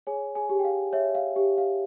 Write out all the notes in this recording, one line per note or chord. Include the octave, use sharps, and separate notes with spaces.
G#4 C#5 G#5
G#4 G#5
G4
G5
F5
C#5 E5
F5
G4
F5